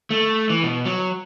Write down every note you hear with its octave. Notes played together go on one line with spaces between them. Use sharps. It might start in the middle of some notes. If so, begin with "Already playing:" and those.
A3
E3
B2
F#3